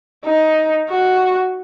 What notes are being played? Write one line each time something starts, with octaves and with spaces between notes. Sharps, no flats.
D#4
F#4